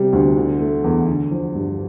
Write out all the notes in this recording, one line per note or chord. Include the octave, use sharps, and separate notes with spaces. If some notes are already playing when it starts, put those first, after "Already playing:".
Already playing: C3 G3
D2
D3
A3
E2
D3
F3
G2